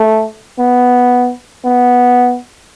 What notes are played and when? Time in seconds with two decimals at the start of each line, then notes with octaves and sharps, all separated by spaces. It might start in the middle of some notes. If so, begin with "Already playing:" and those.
Already playing: A3
0.59 B3
1.64 B3